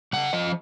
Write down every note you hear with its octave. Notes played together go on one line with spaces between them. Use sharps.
C#3 F#5
F3 D#5